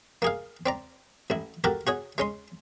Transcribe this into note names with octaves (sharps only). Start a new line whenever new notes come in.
A#3 G#4 F5
C4 D5 A#5
A1 E4
F#4 G4 A4 A#4
F#4 G#4 C#5
G#3 C#4 C6